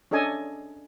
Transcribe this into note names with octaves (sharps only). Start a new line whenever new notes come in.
C#4 D4 A4 D#5 G#5